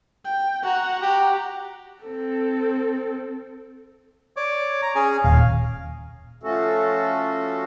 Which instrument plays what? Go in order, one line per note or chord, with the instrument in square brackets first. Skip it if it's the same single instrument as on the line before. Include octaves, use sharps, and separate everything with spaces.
[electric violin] G5
[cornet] F#4 [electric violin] F#5 A#5
[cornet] G4
[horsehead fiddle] C4 A4
[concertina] C#5 D5 D6
A#5
C#4 G#4 G#5
[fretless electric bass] D#1 [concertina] F5
[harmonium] F3 A3 C#4 F#4 A4